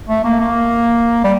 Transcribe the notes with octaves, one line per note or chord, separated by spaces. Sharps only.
A3
A#3
A#3
G3